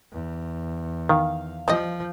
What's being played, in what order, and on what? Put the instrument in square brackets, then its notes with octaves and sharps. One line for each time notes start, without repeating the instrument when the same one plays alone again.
[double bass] E2
[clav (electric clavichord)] D#3 [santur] F5
[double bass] F3 [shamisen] G3 G4 D#5